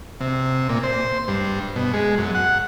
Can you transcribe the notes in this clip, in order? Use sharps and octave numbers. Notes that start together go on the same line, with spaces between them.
C3
A#2
C5
G2
B2
G#3
F#2
F#5